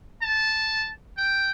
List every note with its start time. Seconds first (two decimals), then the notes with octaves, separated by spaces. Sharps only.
0.22 A5
1.17 G5